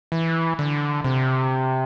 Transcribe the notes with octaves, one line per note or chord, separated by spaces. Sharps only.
E3
D3
C3